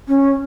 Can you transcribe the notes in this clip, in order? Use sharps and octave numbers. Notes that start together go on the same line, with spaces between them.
C#4